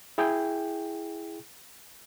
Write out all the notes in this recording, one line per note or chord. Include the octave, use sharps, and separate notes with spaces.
E4 G#4 G5